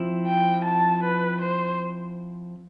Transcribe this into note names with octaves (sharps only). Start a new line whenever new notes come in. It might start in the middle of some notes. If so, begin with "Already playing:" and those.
Already playing: F3 C4 E4
G5
A5
B4
C5